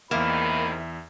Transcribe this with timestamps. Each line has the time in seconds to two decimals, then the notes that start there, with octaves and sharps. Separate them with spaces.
0.11 E2 C3 D#3 A#3 E5 B5 E7